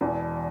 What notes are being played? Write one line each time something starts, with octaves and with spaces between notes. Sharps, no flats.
E1 E2 E3